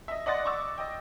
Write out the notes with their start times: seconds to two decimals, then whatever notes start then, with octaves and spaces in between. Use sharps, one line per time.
0.08 D#5 E5
0.26 D5 D#5 F#5 C6 A6
0.45 C#6 D6 E6
0.78 D#5 G5